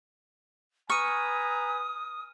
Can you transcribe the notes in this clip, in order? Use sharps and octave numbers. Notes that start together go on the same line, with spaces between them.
B4 G#5 A#5 C#6 D#6 F6 D#7